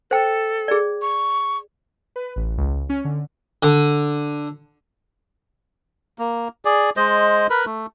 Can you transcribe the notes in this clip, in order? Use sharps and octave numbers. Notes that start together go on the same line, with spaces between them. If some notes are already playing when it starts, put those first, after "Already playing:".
A4 C5 G5
G#4 D5
C#6
B4
A1
C#2
C#4
D3
D3
A#3
G#4 D5
G#3 C5 D#5
A#4 B4 B5
A3